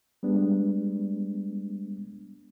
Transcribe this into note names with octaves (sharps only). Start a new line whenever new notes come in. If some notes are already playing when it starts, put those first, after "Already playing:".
G3 G#3 B3 D4